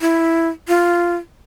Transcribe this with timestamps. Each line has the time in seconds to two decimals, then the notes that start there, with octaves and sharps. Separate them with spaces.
0.01 E4
0.68 F4